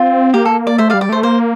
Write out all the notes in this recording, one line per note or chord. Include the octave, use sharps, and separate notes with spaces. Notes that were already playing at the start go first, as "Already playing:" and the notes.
Already playing: C4 F4
A#3 G4
A4
D5
A3 C5 E5
G3 D5 F5
D5
A3 C5
A#3 C5